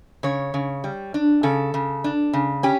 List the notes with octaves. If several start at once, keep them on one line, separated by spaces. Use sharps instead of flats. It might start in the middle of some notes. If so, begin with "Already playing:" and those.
C#3 C#5
C#3
G3
D4
C#3 A4
C#3
D4
C#3
C#4 G4